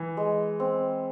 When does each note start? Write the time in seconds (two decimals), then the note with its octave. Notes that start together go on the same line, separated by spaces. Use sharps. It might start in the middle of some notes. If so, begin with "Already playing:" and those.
Already playing: E3
0.17 G#3
0.60 C4